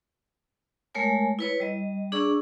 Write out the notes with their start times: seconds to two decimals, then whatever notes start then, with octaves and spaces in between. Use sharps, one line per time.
0.95 G#3 A3 A#4 C#5 G#5
1.39 E4 B4 C#5
1.60 G3 D#5
2.12 D4 G#4 D5 C#6 E6